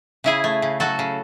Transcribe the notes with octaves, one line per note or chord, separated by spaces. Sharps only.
C#3 E4 G#4
A3
C#3
F#3 F#4 A4
C#3